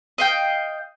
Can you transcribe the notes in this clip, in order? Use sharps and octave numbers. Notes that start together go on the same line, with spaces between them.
D#5 F5 G5